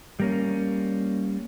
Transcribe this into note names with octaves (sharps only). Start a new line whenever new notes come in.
G3 A#3 C#4